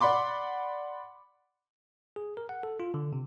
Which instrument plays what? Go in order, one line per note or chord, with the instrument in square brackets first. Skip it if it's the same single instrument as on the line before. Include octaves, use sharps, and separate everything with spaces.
[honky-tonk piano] D5 F#5 B5 C6 D6
[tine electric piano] G#4
A#4
F#5
A4
F4
D3
C3